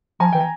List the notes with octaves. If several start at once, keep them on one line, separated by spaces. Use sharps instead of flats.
F3 G#5 A#5
E3 G5
G#5